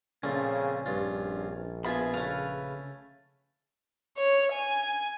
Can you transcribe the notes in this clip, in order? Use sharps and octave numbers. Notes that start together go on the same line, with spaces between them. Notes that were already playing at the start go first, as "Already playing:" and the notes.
A#2 C#3 F3 A3 C4 C#4
A#1 G2 F4
B2 F4 G#4 E5 G#5 B5
C#3 A3 C#4 B4 F5
C#5
G#5